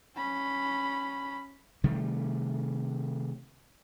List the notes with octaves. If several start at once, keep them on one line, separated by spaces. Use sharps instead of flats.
C#4 B5
C3 D#3 G3 A3